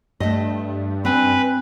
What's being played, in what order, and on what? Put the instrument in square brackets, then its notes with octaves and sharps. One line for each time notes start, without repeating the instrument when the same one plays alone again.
[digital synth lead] G2 [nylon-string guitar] A3 D#5
[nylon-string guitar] C4 G#5 [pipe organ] B4